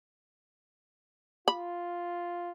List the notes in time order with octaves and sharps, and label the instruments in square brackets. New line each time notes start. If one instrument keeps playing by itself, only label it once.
[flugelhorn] F4 [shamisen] B5